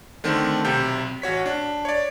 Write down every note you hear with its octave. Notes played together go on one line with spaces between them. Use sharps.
D3 D#3 A3 C4
B1 C3 G5 G6
A1 F#4 C#5 B6
D4
C#5 D5